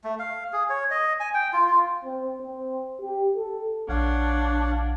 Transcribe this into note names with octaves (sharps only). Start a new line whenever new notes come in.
A3
F5
G#4
C#5
D#5
G#5
G5
F4
F4
C4
C4
G4
A4
A#1 D4 C#5 F5 F#5